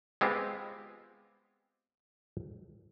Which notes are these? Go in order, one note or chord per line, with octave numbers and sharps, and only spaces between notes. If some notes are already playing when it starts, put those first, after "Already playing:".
G#3 B3 C4 F4 G4